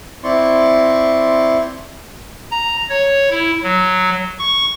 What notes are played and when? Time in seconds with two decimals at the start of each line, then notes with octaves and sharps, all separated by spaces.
0.24 C4 E4 D5 C6 C#6
2.51 A#5
2.89 C#5
3.30 E4
3.63 F#3
4.39 C#6